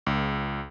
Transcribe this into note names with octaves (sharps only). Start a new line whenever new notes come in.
C#2